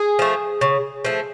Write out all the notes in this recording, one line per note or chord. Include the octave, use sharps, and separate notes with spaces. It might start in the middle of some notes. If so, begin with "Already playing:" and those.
Already playing: G#4
F3 A3
C#3
F3 A3